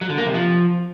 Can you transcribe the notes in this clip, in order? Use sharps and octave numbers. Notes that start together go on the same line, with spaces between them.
F#3
D3
A#3
C3
F3